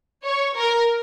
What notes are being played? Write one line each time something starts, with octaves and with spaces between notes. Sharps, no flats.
C#5
A#4